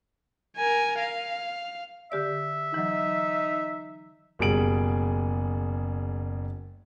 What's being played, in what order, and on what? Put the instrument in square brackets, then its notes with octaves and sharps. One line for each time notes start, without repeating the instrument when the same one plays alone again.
[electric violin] A#4 G#5
F5
[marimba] D3 G4 D5 [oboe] E5
[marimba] E3 F#3 [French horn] D#4
[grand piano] F#1 B2 G3 G#4 D7 F#7